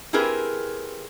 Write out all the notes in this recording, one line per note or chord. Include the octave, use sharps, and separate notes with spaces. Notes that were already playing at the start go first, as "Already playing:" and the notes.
C4 E4 G4 G#4 A#4 B4